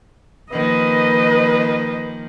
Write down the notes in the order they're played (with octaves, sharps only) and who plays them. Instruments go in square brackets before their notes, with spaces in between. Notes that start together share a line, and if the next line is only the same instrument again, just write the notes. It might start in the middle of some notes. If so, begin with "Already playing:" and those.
[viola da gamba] D#3 F3 A#3 [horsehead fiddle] B4 D#5